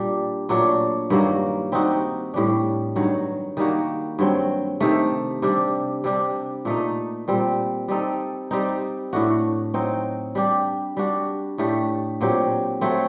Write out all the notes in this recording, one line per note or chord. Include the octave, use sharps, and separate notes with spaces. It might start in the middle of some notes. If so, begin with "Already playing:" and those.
Already playing: A#2 G3 D4
A#2 F#3 A3 D4
G2 D#3 F#3 A#3
G3 C4 D#4 F#4
A2 G3 D4
G2 D#3 F#3
D#3 G3 A#3 F#4
G2 F#3 C4
C3 D#3 A3
C3 G3 D4
C3 G3 D4
A#2 A3 D#4
A#2 G3 C4
G3 C4 D#4 A4
G3 C4 D#4
A2 A3 D4 F#4
F#3 C4 D#4
G3 D4 G4
G3 D4 F#4
A2 A3 D4 G4
A#2 F#3 C4 G4
F#3 A3 C4